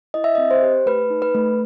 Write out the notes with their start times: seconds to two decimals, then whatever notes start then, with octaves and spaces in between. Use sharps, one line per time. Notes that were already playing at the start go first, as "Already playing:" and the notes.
0.14 E4 D#5
0.24 E5
0.35 C4 D#5
0.51 C5
0.62 G4
0.86 A3 B4
1.10 D#4
1.22 B4
1.35 A3